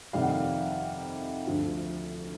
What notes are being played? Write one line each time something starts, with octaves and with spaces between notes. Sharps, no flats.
F2 C3 D#3 G3 F5
F#5
F5
D2 D3 F3